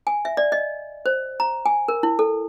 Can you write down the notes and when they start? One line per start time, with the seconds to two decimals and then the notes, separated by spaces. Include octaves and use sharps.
0.07 G#5
0.25 E5
0.37 D5
0.52 D#5
1.06 C5
1.40 A#5
1.66 G#5
1.88 A#4
2.03 E4
2.19 A4